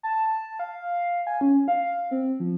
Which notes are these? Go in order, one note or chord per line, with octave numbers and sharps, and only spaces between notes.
A5
F5
G#5
C#4
F5
C4
F3